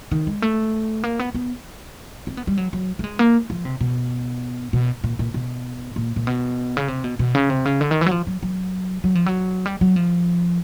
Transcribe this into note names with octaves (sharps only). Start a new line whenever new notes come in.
D#3
G#3
A3
A#3
B3
B3
C4
B3
G3
F#3
F#3
A3
G#3
A#3
F3
C3
B2
B2
A#2
A#2
B2
A#2
A#2
B2
C#3
C3
B2
B2
C#3
C3
C#3
D3
D#3
E3
F#3
F3
F#3
F#3
F#3
F3
F#3
G3
F#3
F3